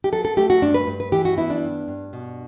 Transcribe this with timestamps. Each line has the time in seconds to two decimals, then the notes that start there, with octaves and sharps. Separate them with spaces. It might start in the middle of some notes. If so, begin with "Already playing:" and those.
0.04 G4
0.12 F#3 A4
0.25 A4
0.37 A3 G4
0.50 F#4
0.62 G2 D4
0.74 B4
0.87 G2
1.00 B4
1.12 E3 G4
1.25 F#4
1.38 B3 E4
1.50 D4
1.63 G2
1.88 G2
2.13 B2